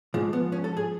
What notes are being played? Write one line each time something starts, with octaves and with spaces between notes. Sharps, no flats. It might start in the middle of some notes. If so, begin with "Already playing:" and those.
G#2 F3 G#3
B3
C#4
A4
G#4